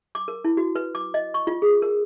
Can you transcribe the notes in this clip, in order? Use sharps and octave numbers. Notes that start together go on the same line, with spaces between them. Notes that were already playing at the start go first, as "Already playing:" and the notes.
D6
A#4
E4
F#4
B4
D6
D#5
C#6
F4
G#4
A#4